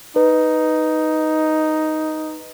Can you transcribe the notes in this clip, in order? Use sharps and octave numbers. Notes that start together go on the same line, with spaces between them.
D#4 B4